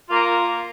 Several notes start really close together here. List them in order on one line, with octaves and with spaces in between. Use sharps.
F4 A#3 A#4